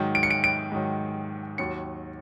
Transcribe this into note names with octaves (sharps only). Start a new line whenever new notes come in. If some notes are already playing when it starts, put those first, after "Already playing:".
Already playing: G#2 D#3 F#3
D7
C#7
D7
D7
G#2 D#3 F#3
D#2 D#3 F#3 C#7